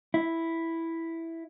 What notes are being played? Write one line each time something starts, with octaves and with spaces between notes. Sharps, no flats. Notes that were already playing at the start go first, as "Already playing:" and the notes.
E4